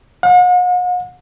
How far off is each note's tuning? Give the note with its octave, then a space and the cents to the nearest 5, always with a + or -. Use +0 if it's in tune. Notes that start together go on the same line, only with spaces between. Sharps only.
F#5 -45